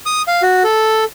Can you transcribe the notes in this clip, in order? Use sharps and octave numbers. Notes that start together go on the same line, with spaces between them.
D#6
F5
F#4
A4